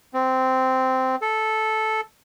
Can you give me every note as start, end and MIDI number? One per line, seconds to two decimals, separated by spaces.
0.14 1.16 60
1.22 2.01 69